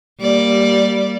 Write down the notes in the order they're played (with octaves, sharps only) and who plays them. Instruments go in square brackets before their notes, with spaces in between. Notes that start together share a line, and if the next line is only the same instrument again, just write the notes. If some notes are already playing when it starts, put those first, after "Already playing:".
[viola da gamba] G3 A#3 D5